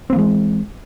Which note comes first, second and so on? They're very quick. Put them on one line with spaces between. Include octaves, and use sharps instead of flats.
C4 A#3 E3 G#3